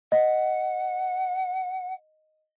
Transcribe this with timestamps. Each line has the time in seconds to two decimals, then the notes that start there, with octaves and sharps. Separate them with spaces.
0.12 D#5 F#5